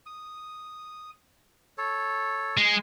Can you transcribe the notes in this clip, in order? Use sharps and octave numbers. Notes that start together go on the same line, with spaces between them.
D#6
A4 C#5
G#3 G#4